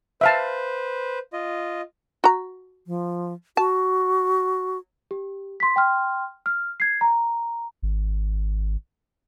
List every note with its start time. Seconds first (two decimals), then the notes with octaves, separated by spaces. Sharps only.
0.21 B4 C5 E5 F5 A5
1.33 F4 D#5
2.24 F#4 A#5
2.87 F3
3.57 F#4 A5
5.11 G4
5.60 C6 B6
5.76 G5 C6 F6
6.46 F6
6.80 G#6 C7
7.01 A#5
7.82 G#1